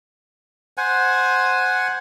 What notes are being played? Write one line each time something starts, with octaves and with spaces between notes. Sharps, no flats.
C5 F#5 G#5